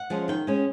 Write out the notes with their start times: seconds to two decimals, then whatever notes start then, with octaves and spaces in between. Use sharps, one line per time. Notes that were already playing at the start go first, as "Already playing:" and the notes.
Already playing: F#5
0.10 F3 G#3 C#4
0.28 D#3 G5
0.47 G#3 C#4